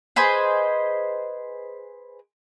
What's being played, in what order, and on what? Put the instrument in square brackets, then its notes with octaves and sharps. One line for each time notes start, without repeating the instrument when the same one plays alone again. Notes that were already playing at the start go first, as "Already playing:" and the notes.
[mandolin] G#4 B4 C5 D#5